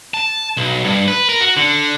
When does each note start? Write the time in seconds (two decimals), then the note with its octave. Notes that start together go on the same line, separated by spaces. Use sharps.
0.14 A5
0.57 B1
0.84 G2
1.08 B4
1.29 A#4
1.41 F#4
1.57 D3